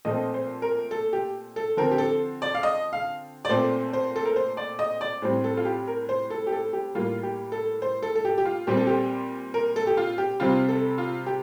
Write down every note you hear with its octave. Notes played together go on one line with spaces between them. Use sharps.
A#2 F3 A3 C4 D#5
C5
A#4
A4
G4
A4
D3 F3 C4 A#4
G4
A4
D5
F5
D#5
F5
D5
A#2 A3 C4 C5
C5
A4
A#4
C5
D5
D#5
D5
A2 G3 C4 C5
A4
F4
G4
A#4
C5
A4
G4
A4
G4
A2 G3 A#3 F4
G4
A4
C5
A4
A4
G4
G4
F4
A#2 G3 C4 G4
A4
G4
A#4
A4
G4
F4
G4
C3 G3 C4 F4
A4
F4
G4